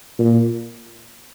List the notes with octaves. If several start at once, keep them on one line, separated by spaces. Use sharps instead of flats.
A#2